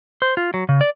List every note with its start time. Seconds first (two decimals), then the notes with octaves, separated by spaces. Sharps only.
0.22 C5
0.37 F4
0.54 F#3
0.69 C#3
0.81 D5